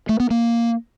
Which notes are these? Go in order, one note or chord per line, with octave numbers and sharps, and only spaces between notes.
A3
B3
A#3